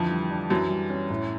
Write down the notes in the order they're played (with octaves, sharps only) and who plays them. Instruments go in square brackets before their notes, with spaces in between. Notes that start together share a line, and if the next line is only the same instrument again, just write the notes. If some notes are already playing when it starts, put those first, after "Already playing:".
Already playing: [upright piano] F2 F3 [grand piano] D3 E3
[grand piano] G3
D4
[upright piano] F#2 F#3 [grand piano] E3
[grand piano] G3
C#4
A2